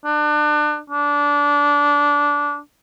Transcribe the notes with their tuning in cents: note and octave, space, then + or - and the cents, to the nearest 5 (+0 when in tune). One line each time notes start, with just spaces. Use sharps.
D4 +30
D4 -20